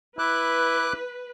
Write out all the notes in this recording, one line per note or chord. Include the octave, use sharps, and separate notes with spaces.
E4 B4 D6 F#6